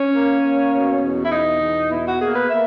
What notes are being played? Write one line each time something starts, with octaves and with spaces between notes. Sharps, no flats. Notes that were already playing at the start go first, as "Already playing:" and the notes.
Already playing: C#4
A#3
A#3
B2
E2
E4
B2 D#4
E2
B2 E4
F#4
A#3 G#4
B4
A#3 E5